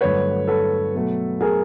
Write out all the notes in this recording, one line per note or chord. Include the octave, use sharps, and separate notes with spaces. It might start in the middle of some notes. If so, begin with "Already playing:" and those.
G2 D3 F#3 A3 B4 C#5
A4 B4
B2 F#3 A3
G#4 A#4